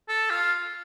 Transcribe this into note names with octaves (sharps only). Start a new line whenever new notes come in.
A4
F4